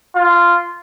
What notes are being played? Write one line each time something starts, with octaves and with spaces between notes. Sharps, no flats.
F4